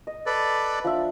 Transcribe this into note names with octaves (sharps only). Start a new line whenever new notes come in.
D#5
A4 B4 D5
F3 D4 E5